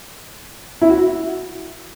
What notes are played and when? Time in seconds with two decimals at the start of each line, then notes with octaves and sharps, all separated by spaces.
0.82 E4
0.90 F#4